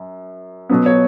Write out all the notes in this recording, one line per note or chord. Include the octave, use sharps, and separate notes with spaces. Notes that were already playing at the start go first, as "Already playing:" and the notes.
Already playing: F#2
B2 F#3 B3
C#5